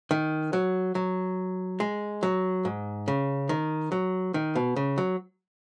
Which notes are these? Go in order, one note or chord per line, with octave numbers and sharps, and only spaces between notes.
D#3
F#3
F#3
G#3
F#3
G#2
C#3
D#3
F#3
D#3
B2
C#3
F#3